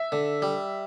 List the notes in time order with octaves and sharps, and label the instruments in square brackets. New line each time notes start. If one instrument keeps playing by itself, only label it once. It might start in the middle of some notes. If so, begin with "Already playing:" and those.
Already playing: [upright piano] E5
[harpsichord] D3
G3